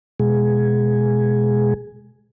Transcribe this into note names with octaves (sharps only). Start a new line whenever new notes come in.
B2 G#3 G#4